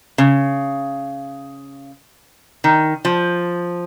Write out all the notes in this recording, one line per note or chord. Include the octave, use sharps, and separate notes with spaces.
C#3
D#3
F3